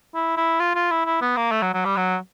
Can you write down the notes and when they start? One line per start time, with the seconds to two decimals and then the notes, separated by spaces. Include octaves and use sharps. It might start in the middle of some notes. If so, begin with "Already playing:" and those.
0.15 E4
0.37 E4
0.60 F4
0.75 F4
0.91 E4
1.06 E4
1.21 B3
1.37 A#3
1.52 A3
1.62 F#3
1.74 F#3
1.85 G3
1.97 F#3